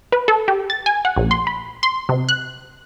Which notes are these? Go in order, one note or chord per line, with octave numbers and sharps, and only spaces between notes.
B4
A4
G4
A6
G#5
F#5
A#1
C6
B5
C6
C3
F#6